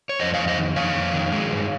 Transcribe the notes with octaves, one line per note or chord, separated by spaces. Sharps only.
C#5
F2 C5 D#5
F2 C#5 F5
C5 D#5
D#3
F2 C#5 F5
F2
D#3
G#3
G2